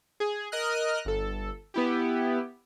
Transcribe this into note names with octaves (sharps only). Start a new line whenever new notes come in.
G#4
A#4 D#5 D#6 F6 F#6
G1 A4
B3 E4 G4